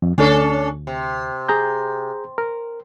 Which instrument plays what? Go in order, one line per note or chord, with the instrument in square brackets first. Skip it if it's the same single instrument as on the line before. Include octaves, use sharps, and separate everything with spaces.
[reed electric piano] F2
[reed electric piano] D2 [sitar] C#4 D4 A4
[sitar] C3
[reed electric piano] G#4 A#5 G6
A#4